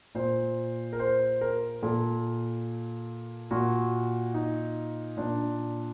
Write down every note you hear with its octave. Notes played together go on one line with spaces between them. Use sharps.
A#2 C5
A#4
C5
A#4
A#2 A4
A#2 F#4
D#4
A#2 D4